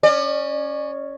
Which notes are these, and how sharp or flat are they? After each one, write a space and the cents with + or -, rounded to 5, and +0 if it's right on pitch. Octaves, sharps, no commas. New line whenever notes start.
C#4 +0 D5 +35